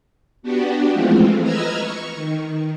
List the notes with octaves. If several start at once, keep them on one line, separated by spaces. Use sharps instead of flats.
B3 D4 F#4 G4
E3 F3 G#3 A3 C4 F4
B4 D#5 A#5 E6 F6 G#6
C#6
D#3